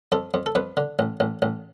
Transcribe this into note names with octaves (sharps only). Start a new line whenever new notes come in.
F2 A4
F2
A4
F2 B4
D3
A1
A1
A1